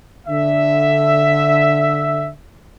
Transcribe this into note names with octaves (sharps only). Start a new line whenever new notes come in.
D3 E5